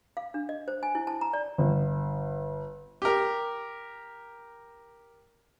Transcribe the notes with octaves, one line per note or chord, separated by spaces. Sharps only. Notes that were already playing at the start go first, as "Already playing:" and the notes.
F5
D4
D#5
C5
G#5
E4
A5
A#5
D5
G1
G4 A#4